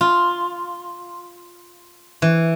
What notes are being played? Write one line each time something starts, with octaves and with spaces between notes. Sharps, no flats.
F4
E3